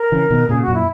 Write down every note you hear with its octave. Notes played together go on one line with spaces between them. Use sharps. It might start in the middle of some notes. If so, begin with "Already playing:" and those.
Already playing: A#4
C#3 E3
B2 D#3
A#2 C#3 G#4
F#4
F#2 A#2
E4